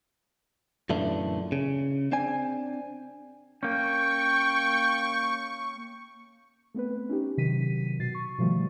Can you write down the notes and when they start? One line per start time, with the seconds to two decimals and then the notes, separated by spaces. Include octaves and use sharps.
0.90 F#2 A#2 D3 E3 A3
1.52 C#3
2.12 C4 D4 G#5
3.63 A#3 C#4 G5 C#6
6.74 A3 B3 C4 B4
7.09 C#4 D#4 G4
7.37 C3 D#3 F#3 B6 D#7
7.99 B2 A6 C7
8.15 C#6
8.38 B2 D3 D#3 F3 G3 A3